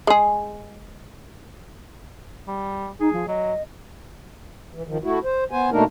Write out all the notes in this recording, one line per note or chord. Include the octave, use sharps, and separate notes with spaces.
G#3 G#4
G3
D#4 G#4
F3
F#3 D#5
E3
D#3 F3
A3 E4 F#4
C5
B3 C5 G#5
B2 A3 A#3 D4 D#4 A#4